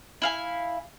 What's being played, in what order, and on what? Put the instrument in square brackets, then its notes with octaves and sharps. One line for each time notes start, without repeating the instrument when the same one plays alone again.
[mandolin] E4 F5 G#5